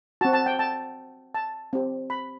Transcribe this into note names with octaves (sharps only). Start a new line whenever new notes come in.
C4 F#4 A5
A5
G5
A5
A5
C4 G4
B5